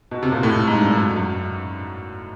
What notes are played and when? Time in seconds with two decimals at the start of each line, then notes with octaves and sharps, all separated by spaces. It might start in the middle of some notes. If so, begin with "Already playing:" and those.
0.11 B2
0.23 C3
0.32 A#2
0.43 A2
0.67 G#2
0.82 G2
0.96 F#2
1.16 F#2